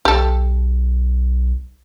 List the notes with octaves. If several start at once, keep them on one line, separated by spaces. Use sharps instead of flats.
B1 G4 A4